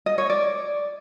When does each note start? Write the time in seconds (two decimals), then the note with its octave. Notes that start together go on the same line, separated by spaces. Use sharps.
0.06 D#5
0.18 C#5
0.30 D5